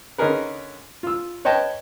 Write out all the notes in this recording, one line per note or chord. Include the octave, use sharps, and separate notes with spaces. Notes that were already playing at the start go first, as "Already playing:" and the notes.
D3 C#4 D#4 G#4 A#4 B4
F4 E6
B4 C#5 D#5 G5 A5